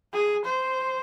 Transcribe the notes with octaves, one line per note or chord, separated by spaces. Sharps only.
G#4
C5